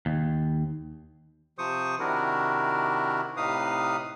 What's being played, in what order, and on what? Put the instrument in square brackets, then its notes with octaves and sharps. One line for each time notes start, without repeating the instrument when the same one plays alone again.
[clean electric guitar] D#2
[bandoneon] C3 F3 C5 C#6 D#6
C3 D#3 D4 E4 F#4 A#4
A2 C3 D#4 B4 F5 D#6